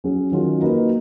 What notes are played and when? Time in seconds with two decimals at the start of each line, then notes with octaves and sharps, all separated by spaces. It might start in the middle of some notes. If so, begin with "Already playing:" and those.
0.04 F#3 C#4 G#4
0.32 D#3 F#3 C#4 F4
0.60 A#3 D#4 F#4 B4